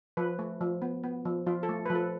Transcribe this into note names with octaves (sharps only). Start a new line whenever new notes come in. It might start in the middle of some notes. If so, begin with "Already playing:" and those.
F3 B4
A3
F3
B3
B3
F3
F3 F4
A4
A3
F3 B4
A4